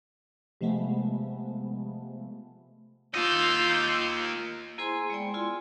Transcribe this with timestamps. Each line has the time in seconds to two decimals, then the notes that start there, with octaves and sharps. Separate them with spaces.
0.61 C3 F3 G#3 A3 B3
3.15 A#3 F4 D#5 E6 G6
4.78 A#3 E4 G#4 C5 G#5 C6
5.10 G#3 B3 D5 G5
5.34 E4 F4 G#4 G#5 C6